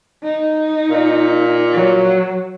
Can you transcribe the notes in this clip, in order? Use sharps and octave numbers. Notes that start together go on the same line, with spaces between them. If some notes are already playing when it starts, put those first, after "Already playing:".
D#4
A#2
F#3